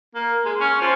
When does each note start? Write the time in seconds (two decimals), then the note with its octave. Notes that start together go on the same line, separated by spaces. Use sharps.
0.15 A#3
0.45 G#3
0.60 C#4
0.81 F3